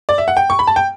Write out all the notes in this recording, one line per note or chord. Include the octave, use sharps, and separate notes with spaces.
D5
E5
F#5
G5
C#6
B5
A5
G5